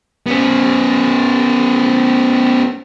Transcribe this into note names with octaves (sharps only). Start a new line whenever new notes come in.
B3 C#4